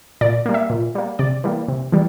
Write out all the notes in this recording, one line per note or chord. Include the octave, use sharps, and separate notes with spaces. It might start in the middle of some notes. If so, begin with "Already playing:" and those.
A#2 D5
G3 A#3
E5
A#2
G3 A#3
C3 D5
E3 G3 A#3
C3
E3 G3